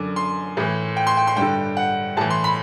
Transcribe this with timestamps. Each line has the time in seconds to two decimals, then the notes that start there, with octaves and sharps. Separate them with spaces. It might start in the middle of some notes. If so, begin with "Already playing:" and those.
Already playing: F#2 D3 D6
0.16 C6
0.57 A2 E3
0.97 G5
1.07 C6
1.17 G5
1.27 C6
1.37 G2 D3 G5
1.77 F#5
2.17 A2 E3 A5
2.30 C6
2.44 B5